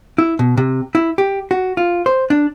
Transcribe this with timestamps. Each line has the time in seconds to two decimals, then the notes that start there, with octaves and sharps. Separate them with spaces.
0.18 E4
0.39 B2
0.57 C3
0.95 E4
1.18 G4
1.51 F#4
1.77 F4
2.06 C5
2.30 D4